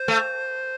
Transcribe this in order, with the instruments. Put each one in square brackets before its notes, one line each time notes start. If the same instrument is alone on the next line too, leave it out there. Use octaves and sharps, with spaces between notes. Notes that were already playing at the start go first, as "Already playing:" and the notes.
Already playing: [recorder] C5
[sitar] A3